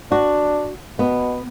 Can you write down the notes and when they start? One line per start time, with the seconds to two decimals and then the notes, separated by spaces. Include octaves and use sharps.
0.12 D4 F#4
0.99 B2 B3